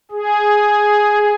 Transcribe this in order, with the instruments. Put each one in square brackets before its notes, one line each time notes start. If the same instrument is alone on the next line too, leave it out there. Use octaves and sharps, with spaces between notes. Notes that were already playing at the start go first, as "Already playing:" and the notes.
[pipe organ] G#4